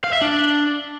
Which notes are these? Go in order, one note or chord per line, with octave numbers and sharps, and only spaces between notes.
F5
E5
D4